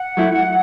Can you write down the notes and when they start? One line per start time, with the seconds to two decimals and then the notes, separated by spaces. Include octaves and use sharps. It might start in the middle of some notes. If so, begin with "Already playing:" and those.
Already playing: F#5
0.17 F#3 A3 E4